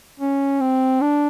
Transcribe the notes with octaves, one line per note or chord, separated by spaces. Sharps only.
C#4
C4
D4